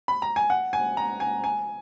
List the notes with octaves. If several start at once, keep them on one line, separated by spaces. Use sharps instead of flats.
B5
A#5
G#5
F#5
G#5
A#5
G#5
G#5